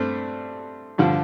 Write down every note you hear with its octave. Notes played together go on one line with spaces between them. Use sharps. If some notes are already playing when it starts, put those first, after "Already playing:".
Already playing: G2 A3 C4
G2 D3 F3